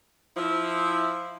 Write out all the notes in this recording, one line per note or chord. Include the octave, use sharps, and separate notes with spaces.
F3 E4